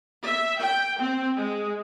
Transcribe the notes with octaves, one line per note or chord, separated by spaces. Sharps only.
E5
G5
C4
G#3